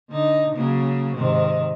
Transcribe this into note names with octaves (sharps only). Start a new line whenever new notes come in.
D3 D#4
C#3 F#3 A#3
G#2 C3 D#3